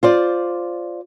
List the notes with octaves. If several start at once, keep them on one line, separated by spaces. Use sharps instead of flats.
F4 C5 D5